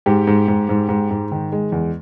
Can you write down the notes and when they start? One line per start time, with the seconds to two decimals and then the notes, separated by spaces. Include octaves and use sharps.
0.06 G#2 G4
0.27 G#2
0.48 G#2
0.69 G#2
0.89 G#2
1.11 G#2
1.32 D#3
1.52 G#3
1.72 E2